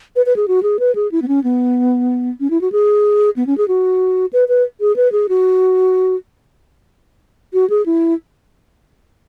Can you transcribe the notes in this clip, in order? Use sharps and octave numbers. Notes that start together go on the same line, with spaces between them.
B4
B4
G#4
F#4
G#4
B4
G#4
E4
B3
C#4
B3
C#4
E4
F#4
G#4
B3
C#4
G#4
F#4
B4
B4
G#4
B4
G#4
F#4
F#4
G#4
E4